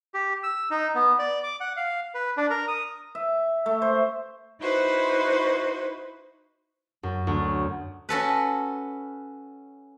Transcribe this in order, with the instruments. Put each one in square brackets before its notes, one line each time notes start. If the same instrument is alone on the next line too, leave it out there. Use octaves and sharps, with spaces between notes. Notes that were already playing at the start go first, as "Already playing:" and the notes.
[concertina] G4
E6
D#4
B3
D5
D6
F#5
F5
B4
D4
A#4
D#6
[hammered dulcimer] E5
A3
C5
[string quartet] D#4 E4 F#4 B4 C5
[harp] F#2
D2
[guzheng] C#4 F#4 A4 B4